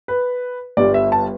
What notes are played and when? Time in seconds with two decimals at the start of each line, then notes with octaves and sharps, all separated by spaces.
0.08 B4
0.77 G1 G2 G3 D5
0.94 E5
1.12 A5